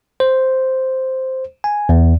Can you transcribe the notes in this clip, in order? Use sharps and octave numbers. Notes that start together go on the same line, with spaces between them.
C5
G#5
E2